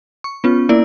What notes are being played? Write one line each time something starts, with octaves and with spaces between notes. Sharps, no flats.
C#6
B3 C#4 F4
A#3 E4 D5